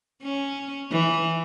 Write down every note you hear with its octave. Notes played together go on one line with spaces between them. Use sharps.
C#4
E3